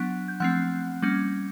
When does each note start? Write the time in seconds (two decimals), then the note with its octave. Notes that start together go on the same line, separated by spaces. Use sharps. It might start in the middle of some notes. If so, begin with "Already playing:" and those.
Already playing: F#3 B3 D4 F#5 F#6
0.28 G6
0.40 F3 A3 C4 F#5 F#6
1.02 G3 A#3 C#4